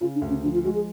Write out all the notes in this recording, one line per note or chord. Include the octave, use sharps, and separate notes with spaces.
C#3 F4
D4
D2
C#4
F3 D4
F4
G#3 F#4
G#4